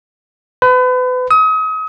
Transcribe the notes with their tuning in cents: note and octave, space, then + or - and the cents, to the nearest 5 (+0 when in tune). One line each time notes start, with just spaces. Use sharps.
B4 +35
D#6 +35